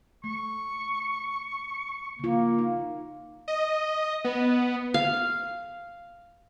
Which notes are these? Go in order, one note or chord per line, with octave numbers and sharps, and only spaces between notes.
A3 C#6
C#3 A#3 F4
D#4
D#5
B3
F5